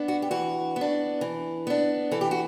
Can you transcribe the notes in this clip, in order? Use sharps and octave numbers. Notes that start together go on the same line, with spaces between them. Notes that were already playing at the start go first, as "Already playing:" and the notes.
Already playing: B3 D4
F#4
G4
E3 F#4
B3
D4
E3
B3 D4
E3 A4
G4
F#4